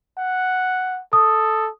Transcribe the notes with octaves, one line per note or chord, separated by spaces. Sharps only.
F#5
A4 D#6